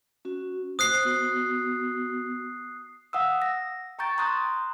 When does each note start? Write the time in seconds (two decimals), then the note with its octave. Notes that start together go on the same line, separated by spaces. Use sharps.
0.25 C#4 F#4
0.79 C5 D#6 F#6 C7
1.05 B3 F#4
3.13 F5 F#5 D#6 E6
3.42 A#6
3.99 G5 A#5 C#6 G6 A6 D7
4.18 A#5 C6 D#6 F#6 G6